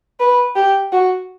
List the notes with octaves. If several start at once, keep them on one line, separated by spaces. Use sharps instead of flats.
B4
G4
F#4